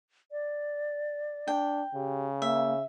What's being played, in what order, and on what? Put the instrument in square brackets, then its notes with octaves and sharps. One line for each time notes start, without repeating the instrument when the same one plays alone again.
[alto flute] D5
[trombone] D4 [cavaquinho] G5
[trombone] C#3 [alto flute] G4
[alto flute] A#3 [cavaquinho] E5